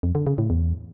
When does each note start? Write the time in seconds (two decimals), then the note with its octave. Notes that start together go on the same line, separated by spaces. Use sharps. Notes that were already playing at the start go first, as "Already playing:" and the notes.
0.03 F2
0.15 D3
0.27 C#3
0.38 A2
0.50 E2